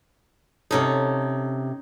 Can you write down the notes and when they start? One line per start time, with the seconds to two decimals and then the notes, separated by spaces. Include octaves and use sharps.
0.71 C3 C#4 D#4 A4